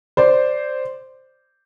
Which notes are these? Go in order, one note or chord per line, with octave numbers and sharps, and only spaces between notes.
C5 D5